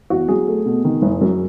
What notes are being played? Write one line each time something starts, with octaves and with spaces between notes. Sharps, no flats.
E2 F#4
F#3 G#4
A3
B2
D#3
F#1
F#2